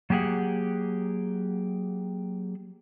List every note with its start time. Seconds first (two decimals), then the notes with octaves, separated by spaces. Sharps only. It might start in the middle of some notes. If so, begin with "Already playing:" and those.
0.10 F#3 A#3 G4 G#4 F#5